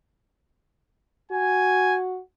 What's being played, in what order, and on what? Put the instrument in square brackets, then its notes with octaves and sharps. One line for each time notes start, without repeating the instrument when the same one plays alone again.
[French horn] F#4 [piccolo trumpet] G#5